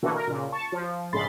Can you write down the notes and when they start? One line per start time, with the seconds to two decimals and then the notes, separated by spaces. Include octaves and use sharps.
0.03 B2 D3 E3 A#3 F#4 A4
0.14 A#4
0.27 A#2 C#3
0.52 A5 C#6
0.72 F3
1.13 A#1 G#2 C#3 B5 C6 A6